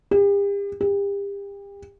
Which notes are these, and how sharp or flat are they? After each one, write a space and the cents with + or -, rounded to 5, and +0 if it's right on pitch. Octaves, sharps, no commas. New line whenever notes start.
G4 +40
G4 +35